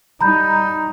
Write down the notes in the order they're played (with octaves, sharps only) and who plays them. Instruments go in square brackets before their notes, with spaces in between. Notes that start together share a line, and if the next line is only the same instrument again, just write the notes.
[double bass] G3 D#4 [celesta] A#5 B5 G6